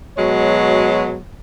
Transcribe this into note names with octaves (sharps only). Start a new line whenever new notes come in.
B2 F#3 G#3 C#5